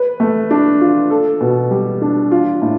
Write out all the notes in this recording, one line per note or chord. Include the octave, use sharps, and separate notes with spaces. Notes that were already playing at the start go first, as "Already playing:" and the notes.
Already playing: B4
A3
D4
F4
A4
B2
G3
D4
F4
A2